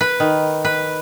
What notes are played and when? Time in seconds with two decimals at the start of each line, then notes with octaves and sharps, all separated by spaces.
0.01 B4
0.20 D#3
0.65 B4